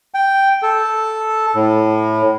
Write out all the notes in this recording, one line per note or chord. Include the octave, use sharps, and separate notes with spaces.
G5
A4
A2